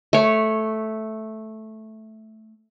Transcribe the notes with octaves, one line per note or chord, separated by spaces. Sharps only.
A3 C#5